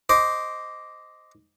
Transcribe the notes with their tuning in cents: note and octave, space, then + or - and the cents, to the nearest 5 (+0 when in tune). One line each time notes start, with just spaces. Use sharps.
C5 +0 D#5 +0 D6 -10